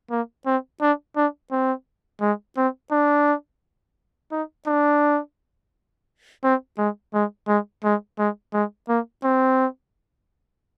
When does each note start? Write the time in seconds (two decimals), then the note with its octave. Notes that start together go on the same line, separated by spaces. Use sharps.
0.11 A#3
0.46 C4
0.81 D4
1.16 D4
1.51 C4
2.21 G#3
2.57 C4
2.91 D4
4.32 D#4
4.67 D4
6.44 C4
6.78 G#3
7.14 G#3
7.48 G#3
7.84 G#3
8.19 G#3
8.53 G#3
8.89 A#3
9.24 C4